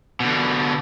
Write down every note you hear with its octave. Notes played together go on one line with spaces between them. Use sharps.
B2 D3